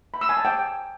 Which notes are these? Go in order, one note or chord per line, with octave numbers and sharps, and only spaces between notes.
B5
E6
G#5
A5
G5